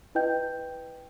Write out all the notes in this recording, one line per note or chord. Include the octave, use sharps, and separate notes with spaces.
E4 B4 D#5 G5 G6